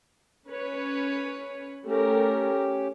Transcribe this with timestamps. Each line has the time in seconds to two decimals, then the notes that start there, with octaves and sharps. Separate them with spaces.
0.48 C#4 B4 C#5
1.86 A3 C#4 G4 A#4